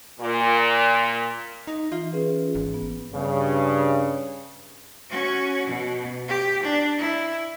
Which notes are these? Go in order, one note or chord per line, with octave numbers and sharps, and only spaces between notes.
A#2
D#4
E3 F4
C#4 G#4 B4
G#1
B3
G2 C#3
C#4 F#4
B2
G4
D4
E4